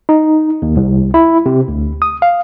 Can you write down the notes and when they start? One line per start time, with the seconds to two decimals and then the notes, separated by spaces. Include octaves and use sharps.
0.09 D#4
0.62 D#2
0.76 C2
1.14 E4
1.46 C3
1.68 D2
2.02 D#6
2.22 F5